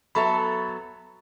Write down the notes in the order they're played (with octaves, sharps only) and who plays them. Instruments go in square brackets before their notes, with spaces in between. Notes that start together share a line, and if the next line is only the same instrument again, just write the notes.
[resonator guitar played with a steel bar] F#3 B3 A4 E5 [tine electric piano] B5